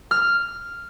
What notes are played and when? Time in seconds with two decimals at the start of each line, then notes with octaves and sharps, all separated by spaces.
0.11 F6